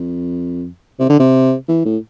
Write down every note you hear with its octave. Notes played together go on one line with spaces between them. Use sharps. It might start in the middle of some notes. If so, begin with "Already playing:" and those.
Already playing: F2
C3
D3
C3
E3
A2